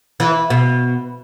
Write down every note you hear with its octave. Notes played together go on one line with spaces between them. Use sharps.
E3
B2